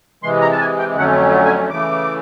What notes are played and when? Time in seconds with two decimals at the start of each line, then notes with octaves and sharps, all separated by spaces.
0.23 C3 E3 G#3 C6
0.42 A#5
0.52 A5
0.60 G#5
0.79 G5
0.96 F2 D3 F#3 A3 C#4 F#5
1.46 G#5
1.70 C#3 E3 A3 D6